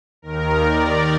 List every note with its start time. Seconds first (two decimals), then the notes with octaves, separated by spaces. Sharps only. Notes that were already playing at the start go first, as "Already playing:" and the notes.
0.22 D#2 D#3 A#4
0.59 D5